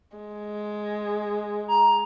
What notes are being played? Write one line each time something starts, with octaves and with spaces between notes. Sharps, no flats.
G#3
A#5